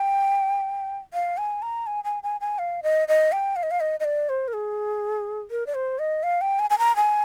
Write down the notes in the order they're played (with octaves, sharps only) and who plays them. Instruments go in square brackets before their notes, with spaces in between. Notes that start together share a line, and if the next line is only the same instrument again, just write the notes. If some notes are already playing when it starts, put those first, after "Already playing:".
Already playing: [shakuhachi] G5
F5
G#5
A#5
G#5
G#5
G#5
G#5
F5
D#5
D#5
G5
F5
D#5
F5
D#5
D#5
D5
C5
A#4
G#4
A#4
D5
C5
D#5
F5
G5
G#5
G#5
A#5
G#5